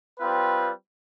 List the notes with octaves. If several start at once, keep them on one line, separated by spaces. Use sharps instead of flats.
G3 C4 F4 B4